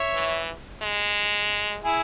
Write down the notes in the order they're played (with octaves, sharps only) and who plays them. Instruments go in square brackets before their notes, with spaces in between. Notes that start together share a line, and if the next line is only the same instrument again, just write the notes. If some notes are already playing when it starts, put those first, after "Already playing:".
Already playing: [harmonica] C#5 E5
[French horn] E3
G#3
[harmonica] E4 G#4